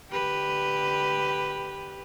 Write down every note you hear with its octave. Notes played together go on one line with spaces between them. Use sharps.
D3 G4 B4